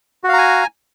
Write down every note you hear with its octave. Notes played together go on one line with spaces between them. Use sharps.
F#4 F5 G#5 A#5